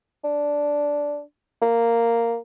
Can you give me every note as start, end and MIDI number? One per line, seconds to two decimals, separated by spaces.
0.24 1.21 62
1.62 2.37 58